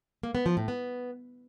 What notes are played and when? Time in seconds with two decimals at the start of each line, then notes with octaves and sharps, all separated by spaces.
0.23 A#3
0.35 B3
0.46 F3
0.57 A2
0.68 B3